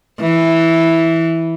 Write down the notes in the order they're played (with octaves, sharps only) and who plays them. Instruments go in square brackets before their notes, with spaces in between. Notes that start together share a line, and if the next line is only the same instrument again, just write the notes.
[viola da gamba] E3